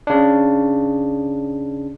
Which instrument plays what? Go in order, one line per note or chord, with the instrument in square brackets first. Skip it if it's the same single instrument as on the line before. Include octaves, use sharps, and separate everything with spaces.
[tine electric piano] C#3 D4